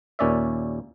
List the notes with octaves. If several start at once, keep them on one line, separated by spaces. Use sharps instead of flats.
D#2 A#2 C#4 D5 E5